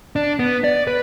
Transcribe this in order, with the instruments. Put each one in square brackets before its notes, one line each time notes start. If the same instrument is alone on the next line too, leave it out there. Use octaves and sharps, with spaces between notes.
[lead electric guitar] D4
B3
D5
B4